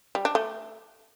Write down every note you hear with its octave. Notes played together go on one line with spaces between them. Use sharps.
G3
D4
A3